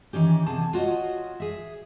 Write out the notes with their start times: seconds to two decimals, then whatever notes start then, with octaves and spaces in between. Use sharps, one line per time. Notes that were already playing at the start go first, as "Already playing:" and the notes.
0.13 D#3 E3 C#4 G4
0.46 E2 C3 G#4 A5
0.73 F4 F#4 C#5 D#5
1.40 G#4 E5